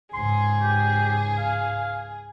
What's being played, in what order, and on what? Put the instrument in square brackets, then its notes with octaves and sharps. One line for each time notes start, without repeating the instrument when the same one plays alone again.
[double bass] C#2 G#2 [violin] G#4 [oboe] C6
[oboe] G4
F5